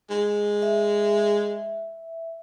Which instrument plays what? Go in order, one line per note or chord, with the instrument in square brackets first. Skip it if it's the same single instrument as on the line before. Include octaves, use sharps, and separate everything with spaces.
[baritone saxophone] G#3
[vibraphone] E5